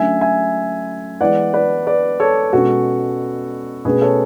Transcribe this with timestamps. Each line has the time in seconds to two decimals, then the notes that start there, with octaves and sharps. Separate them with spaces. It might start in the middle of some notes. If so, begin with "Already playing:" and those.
Already playing: D3 F#3 A3 C#4 E5 G#5
0.21 E5 G#5
1.21 E3 G#3 B3 D5 F#5
1.54 B4 D5
1.87 B4 D5
2.20 A4 C#5
2.53 B2 G#3 C#4 F#4 A4
3.85 B2 A3 C#4 G#4 B4
4.02 A4 C#5